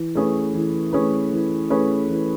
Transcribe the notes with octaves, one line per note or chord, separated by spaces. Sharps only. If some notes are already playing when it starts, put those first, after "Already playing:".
Already playing: E3
A3 C#4 G#4 B4
E3
A3 C#4 G#4 B4
E3
A3 C#4 G#4 B4
E3